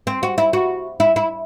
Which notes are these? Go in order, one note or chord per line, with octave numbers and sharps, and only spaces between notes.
C4
F#4
E4
F#4
E4
E4